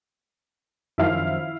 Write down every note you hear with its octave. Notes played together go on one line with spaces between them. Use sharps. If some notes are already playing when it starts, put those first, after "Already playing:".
F#2 D#3 F3 E4 F5